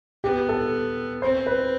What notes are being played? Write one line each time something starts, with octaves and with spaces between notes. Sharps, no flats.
B3 G4
A4
C4 C5
B4